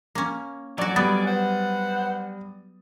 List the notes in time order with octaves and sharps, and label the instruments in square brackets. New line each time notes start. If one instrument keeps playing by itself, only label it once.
[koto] A#3 C#4
[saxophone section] F2 C#4 D5 [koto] F#3 F#4
[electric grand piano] G3 D#6 A6 [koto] B3
[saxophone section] B4 C5 F#5